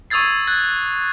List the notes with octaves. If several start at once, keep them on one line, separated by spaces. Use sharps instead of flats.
C#6 D#6 E6 G#6 A6 C7
F#6 G#6 A6